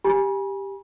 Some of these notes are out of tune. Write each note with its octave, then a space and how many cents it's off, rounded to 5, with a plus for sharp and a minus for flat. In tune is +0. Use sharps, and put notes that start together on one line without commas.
G4 +5 G#5 -5 B5 -45